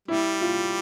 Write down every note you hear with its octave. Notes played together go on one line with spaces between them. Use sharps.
G3 E4
F4